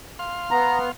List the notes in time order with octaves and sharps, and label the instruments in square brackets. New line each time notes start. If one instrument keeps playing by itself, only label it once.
[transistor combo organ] F5 C6
[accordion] B3 [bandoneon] A#5